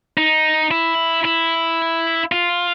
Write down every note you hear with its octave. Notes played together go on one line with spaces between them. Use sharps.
D#4
E4
E4
F4